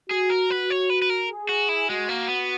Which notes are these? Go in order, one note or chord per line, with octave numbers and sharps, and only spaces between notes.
F#4 G#4
A#4
B4
C#5
B4
B4
A#4
G#4
F#4
E4
G#3 F#4
A#3
B3